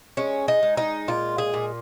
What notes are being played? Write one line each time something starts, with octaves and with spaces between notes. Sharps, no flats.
G#3 C#4
D#4
G#3
D#4
A#2 F4
G#4
A#2